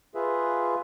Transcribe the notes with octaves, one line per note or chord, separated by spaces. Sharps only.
F4 G#4 B4 E5